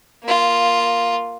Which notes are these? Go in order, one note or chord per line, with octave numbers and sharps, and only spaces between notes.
A#3 F4